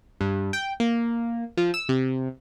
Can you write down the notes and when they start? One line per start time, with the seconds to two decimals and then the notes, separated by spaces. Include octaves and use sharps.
0.21 G2
0.53 G5
0.80 A#3
1.57 F3
1.74 E6
1.89 C3